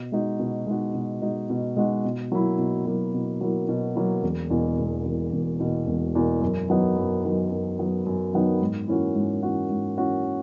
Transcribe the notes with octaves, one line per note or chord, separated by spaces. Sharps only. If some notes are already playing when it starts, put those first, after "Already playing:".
Already playing: B2
G#3 D#4 F#4
B2
G#3 D#4 F#4
B2
G#3 D#4 F#4
B2
G#3 D#4 F#4
B2
F#3 A#3 E4
B2
F#3 A#3 E4
B2
F#3 A#3 E4
B2
F#3 A#3 E4
E1
E2 B2 A#3
E1
E2 B2 A#3
E1
E2 B2 A#3
E1
E2 B2 A#3
F#2
D#3 F#3 B3 D#4
F#2
D#3 F#3 B3 D#4
F#2
D#3 F#3 B3 D#4
F#2
D#3 F#3 B3 D#4
G#2
E3 A#3 C#4 F#4
G#2
E3 A#3 C#4 F#4
G#2
E3 A#3 C#4 F#4